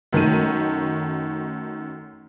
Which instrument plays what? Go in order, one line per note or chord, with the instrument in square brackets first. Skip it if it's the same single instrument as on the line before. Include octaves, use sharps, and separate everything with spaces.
[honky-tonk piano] F#2 D#3 A3 D#7